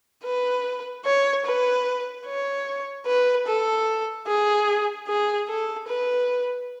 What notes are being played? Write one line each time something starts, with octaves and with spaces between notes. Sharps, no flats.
B4
C#5
B4
C#5
B4
A4
G#4
G#4
A4
B4